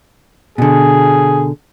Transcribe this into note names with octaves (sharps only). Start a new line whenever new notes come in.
B2 D3 G#4